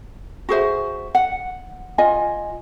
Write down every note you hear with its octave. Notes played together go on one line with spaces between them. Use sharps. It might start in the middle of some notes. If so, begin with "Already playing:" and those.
F#4 G#4 C5 E5
F#5
F4 D#5 G#5